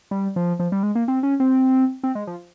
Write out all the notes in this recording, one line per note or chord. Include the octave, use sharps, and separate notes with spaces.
G3
F3
F3
G3
G#3
A#3
C4
C#4
C4
C4
G#3
F3